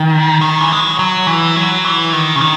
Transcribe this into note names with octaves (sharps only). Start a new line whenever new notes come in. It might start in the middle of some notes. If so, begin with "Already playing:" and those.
Already playing: D#3
D#3
E3
G#3
F#3
F#3
E3
F#3
E3
D#3
C#3
D#3